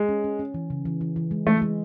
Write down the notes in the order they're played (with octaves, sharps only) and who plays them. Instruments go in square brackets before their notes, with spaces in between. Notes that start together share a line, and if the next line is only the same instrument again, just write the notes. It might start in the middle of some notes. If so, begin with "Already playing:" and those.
Already playing: [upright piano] G#3
[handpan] C#4
C#4
C#4
E3
C#3
E3
E3
E3
G#3
[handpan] E3 [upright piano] A3
[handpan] G#3